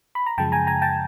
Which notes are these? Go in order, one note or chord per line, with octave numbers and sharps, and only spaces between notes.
B5
A#5
F#2 C#3 F3 G#3 G5 A5
G#5 A#5
G#5 A#5
G5 A5